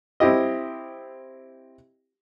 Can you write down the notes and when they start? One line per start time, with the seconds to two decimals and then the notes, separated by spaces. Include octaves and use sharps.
0.20 C4 E4 G4 D#5